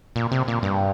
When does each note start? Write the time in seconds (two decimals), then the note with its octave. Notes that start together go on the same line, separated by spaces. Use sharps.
0.16 A#2
0.32 C3
0.48 A#2
0.63 G2